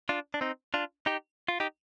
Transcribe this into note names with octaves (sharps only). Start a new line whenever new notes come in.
D4 F4
D4
C4 D#4
D4 F4
D#4 G4
F4
D#4 G4